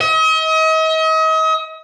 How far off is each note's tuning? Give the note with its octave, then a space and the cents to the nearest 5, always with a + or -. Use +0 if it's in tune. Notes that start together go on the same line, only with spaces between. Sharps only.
D#5 +40